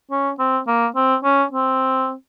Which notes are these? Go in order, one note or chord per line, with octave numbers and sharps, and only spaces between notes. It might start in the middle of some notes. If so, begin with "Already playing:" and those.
C#4
C4
A#3
C4
C#4
C4